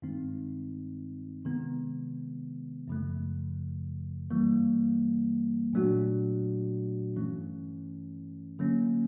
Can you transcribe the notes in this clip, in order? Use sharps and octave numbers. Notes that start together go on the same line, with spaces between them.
G2 D#3 G#3 C4 D#4
C3 D#3 G#3 B3
F#2 C#3 F3 A3
G2 E3 G3 A#3
A#2 F#3 A3 D4 F#4
G2 E3 A3 C#4
D3 F#3 A#3 C#4